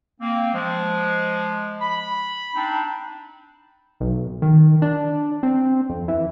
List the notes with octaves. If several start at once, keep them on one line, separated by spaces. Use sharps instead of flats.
A#3 C4
F3 G#3
B5
C4 D4 D#4
B1
D#3
D4
C4
F2
E3